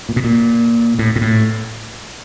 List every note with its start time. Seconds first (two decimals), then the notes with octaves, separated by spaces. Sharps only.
0.09 A#2
0.16 B2
0.24 A#2
0.99 A2
1.16 A#2
1.21 A2